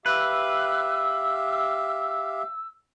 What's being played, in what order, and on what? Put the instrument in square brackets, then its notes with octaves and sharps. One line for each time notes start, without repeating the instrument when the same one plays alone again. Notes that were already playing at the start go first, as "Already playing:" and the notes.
[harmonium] G4 E5 F5 [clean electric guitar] B4 [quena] E6